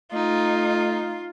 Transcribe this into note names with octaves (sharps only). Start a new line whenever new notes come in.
A3 D#4 F4